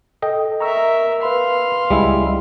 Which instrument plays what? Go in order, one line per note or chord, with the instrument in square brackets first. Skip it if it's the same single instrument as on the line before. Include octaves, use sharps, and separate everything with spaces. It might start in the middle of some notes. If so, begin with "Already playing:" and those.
[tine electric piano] A4 [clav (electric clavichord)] D#5 G5
[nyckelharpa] A#4 E5 [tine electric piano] A#5 C#6 E6
[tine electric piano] B4 B5 [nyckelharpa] F5 C6
[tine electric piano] C#2 [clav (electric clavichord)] G3 G#3 E4